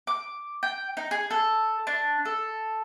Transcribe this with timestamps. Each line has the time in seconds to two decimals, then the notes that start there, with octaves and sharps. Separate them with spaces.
0.07 D6
0.63 G5
0.97 D#4
1.11 G#4
1.31 A4
1.87 D4
2.25 A4